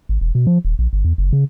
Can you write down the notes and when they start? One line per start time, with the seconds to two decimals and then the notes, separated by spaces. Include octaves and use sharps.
0.09 G#1
0.21 E1
0.35 B2
0.47 F3
0.65 D#1
0.79 A#1
0.93 G1
1.05 E2
1.18 F#1
1.33 C#3